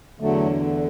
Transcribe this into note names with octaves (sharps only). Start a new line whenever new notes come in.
E2 D3 F#3 A3